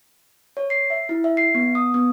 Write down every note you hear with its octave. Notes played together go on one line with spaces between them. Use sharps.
C#5
C7
E5
E4
E5
C7
B3
D#6
B3